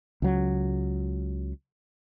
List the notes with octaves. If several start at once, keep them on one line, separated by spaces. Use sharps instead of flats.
C#2 F#3